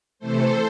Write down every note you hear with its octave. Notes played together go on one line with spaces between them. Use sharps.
C3 E3 A3 A4 C5